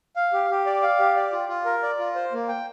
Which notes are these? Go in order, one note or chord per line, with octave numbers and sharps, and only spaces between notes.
F5
G4
G4
D5
F5
G4
D5
F4
F4
A#4
D5
F4
C5
A#3
G5